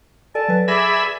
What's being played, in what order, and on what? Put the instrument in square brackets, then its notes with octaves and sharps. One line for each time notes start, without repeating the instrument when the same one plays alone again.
[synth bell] A4 D5 G#5 [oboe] A5
[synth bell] F#3 B4
[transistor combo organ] G#4 E5 B5 [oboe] D5 [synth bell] A#6